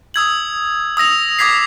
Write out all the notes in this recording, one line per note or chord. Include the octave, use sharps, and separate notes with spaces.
D#6 E6 G#6 F#7
D#6 E6 A#6 F7
D6 D#6 G#6 B6 C7